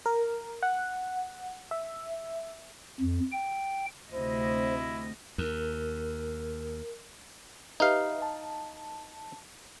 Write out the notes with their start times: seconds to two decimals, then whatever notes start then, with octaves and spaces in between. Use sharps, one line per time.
0.06 A#4
0.63 F#5
1.71 E5
3.00 F2
3.32 G5
4.12 D2 C3 E4 C5 D#5
5.38 D#2 A#4
7.80 D#4 G4 B4 E5 F5
8.22 A5